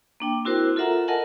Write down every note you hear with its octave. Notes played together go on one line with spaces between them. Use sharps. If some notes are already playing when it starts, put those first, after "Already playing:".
A#3 D4 G5
C4 E4 F#4 A#4 C5
F4 A4 A#4 E5 F#5 A#5
A4 A#4 D#5 F#5 G#5 A5